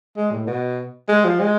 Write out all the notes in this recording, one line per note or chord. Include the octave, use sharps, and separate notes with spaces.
G#3
A2
B2
G#3
F3
G#3